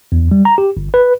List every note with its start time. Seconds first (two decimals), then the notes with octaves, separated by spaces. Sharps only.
0.12 E2
0.31 G3
0.45 A#5
0.58 G4
0.77 G1
0.94 B4